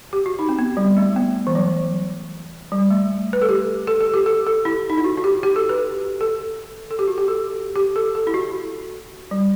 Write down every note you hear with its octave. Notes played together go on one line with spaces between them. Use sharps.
G4
F#4
D#4
C4
B3
G3
A3
B3
E3
F#3
G3
A3
B4
A4
G4
A4
A4
G4
A4
A4
E4
D#4
E4
F#4
F#4
G4
G4
A4
B4
A4
A4
G4
F#4
G4
A4
G4
A4
A4
E4
F#4
G3